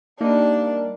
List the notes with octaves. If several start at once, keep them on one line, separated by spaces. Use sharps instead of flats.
G3 A#3 D4 D#4